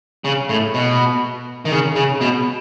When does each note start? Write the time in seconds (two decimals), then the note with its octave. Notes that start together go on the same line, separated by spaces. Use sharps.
0.25 C#3
0.49 A2
0.74 B2
1.65 D#3
1.72 C#3
1.96 C#3
2.21 B2